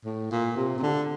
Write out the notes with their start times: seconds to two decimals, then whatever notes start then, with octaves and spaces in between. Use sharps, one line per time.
0.05 A2
0.31 A#2
0.56 C3
0.78 C3
0.82 D3